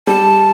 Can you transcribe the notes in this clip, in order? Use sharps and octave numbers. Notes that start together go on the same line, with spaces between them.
G3 A5